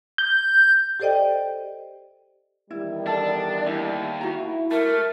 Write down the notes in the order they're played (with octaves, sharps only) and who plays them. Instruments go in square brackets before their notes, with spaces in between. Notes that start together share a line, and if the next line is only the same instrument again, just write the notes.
[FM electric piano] G6
[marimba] G4 A4 C5 D5 D#5 G5
[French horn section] E2 D#3 G3 [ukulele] E4
[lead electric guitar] D4 [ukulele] A4 A5
[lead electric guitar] D#2 [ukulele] E4
[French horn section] E4 [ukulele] F#4 A#5
[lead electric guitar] A3 [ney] A#4